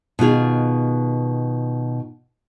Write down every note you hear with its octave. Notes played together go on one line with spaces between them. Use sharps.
B2 D#3 F4 G#4